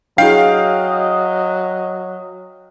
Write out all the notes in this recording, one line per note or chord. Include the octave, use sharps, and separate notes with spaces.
F#3 D4 E4 G#4 D#5 F5 G5 C7